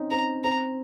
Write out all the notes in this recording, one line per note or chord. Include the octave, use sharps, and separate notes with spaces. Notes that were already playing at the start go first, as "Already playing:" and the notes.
Already playing: C4 C#4 D#4
C4 A#5
C4 A#5